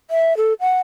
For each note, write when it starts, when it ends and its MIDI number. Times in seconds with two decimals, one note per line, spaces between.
0.11 0.36 76
0.37 0.53 69
0.61 0.81 78